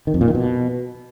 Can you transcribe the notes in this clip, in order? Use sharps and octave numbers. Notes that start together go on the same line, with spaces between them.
D#3
F2
A#2
D#3
B2